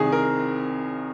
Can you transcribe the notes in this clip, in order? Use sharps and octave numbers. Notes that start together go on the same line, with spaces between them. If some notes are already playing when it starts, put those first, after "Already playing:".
Already playing: C2 C3 D#3 G#4
A#4